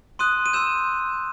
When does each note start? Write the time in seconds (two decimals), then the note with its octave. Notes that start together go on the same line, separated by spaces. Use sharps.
0.19 C6 D#6 F#6 D#7
0.46 D#7
0.53 C6 E6 G6 E7